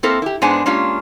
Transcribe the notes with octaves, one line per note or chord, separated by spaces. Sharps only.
A#3 C4 E4 A4 A#4 C5
E4 G4
G#2 G#3 B3 D4 C5 G#5
G#3 A#3 C#4 D4 F4 G4